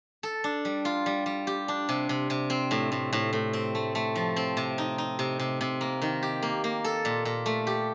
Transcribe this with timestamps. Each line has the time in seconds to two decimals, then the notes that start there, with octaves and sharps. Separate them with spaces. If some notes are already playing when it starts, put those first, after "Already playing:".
0.23 A4
0.44 D4
0.65 G3
0.85 F4
1.06 G3
1.26 G3
1.47 G4
1.68 D4
1.89 C3
2.09 C3
2.30 C3
2.50 C4
2.71 A2
2.92 A2
3.13 A2
3.33 A2
3.53 C4
3.75 A3
3.95 A3
4.15 F3
4.36 C4
4.57 C3
4.78 D#4
4.98 D#4
5.19 C3
5.40 C3
5.61 C3
5.81 A#3
6.02 D#3
6.23 G4
6.42 A#3
6.64 A#3
6.85 A4
7.05 A#2
7.25 A#2
7.46 A3
7.67 G4